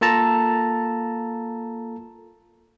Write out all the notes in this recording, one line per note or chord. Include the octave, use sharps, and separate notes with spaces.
A#3 F4 A4 A5 A#5